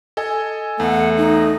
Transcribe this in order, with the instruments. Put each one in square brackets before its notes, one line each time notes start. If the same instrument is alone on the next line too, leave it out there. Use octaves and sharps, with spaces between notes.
[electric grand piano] A4 D#5 G#5
[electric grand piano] E2 [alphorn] A3 [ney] F#5
[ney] D#4